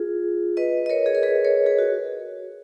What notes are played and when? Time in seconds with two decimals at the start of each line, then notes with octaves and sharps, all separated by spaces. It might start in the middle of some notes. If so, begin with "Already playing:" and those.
Already playing: F4 G#4
0.57 B4 D#5
0.86 D#5
0.90 A#4 C#5
1.06 G#4
1.15 A#4
1.23 G#4 B4
1.45 A#4 C#5
1.66 G#4 B4
1.78 F#4